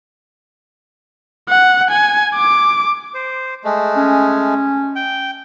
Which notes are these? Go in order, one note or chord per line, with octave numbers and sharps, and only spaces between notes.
F#5
G#5
D6
C5
G#3 A3
C#4
G5